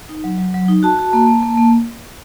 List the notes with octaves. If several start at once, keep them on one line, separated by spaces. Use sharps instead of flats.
D#4
F#3
F#3
F#3
D#4
F#4 A5
F#4
A#3
A#3
A#3
A#3